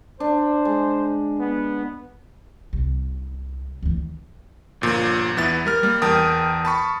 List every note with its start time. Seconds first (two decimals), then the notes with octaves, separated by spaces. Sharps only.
0.20 D4 C5
0.65 G#3
1.40 B3
2.73 C2
3.83 D2 E3
4.81 G1 A#2 F3
5.37 E2 B3 E4 A6
5.66 G3 A#4 F6
5.83 G3 A#3
6.02 E2 A#4 G5 A5 D#6
6.65 A5 B5 C#6